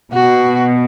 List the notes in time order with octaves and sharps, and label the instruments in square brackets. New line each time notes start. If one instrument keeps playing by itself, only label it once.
[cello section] B2 [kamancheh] F#4